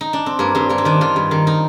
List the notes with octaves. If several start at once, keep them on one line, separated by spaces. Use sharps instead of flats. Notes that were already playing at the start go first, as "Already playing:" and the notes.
D#4
D4
C4
G2 A#3
G2 C4
G2 A#3
C4
D#3 D4
D#3 F4
G2
D#3
D#4